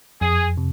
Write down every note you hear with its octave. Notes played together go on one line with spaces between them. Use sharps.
F2 G#4
C3